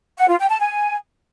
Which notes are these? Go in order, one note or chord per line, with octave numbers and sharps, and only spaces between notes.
F#5
F4
G5
A5
G#5